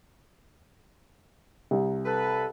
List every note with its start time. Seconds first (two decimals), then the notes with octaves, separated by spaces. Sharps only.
1.71 C2
2.06 A4 B4